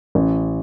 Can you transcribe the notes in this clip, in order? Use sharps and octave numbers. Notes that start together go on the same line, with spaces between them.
A1